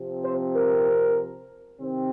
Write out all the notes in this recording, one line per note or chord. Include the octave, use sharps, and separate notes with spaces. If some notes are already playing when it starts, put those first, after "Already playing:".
Already playing: C3 F3 C4
C5
A#4
C3 D#3 C4